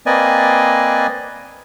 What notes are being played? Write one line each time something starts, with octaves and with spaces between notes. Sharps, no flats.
A#3 C4 B4 D5 D#5 G#5